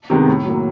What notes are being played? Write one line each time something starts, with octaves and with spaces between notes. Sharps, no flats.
C3 D#3 G#3 B3
A2
F#3 A#3